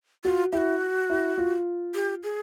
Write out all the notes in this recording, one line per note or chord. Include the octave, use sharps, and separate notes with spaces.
F4 F#4
E4 F#4 G4
E4
F4
G4
G#4